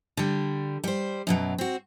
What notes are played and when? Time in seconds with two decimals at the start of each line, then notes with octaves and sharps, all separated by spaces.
0.17 D3 G3
0.84 G3 C5
1.27 F#2 B2 F#3
1.58 C4 F#4